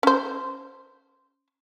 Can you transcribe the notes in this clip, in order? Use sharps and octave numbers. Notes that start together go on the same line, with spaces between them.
C#4 C5